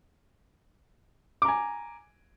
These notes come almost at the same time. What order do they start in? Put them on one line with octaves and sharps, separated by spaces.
D6 A#5 G#5